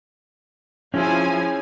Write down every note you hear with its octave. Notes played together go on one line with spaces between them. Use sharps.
F3 C#4 E4 G#4 G#5